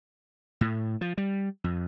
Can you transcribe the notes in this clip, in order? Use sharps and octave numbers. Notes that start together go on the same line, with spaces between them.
A2
F3
G3
F2